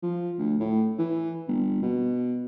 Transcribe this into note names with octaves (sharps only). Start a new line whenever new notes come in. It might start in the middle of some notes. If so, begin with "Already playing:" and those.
F3
D2
A2
E3
G1
B2